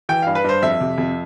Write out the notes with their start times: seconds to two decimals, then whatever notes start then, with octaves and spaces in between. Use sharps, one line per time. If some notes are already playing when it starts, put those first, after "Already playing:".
0.09 E3 G5
0.22 G2 F5
0.35 B4
0.44 G2 C5
0.62 F2 E5
0.80 C3
0.98 F2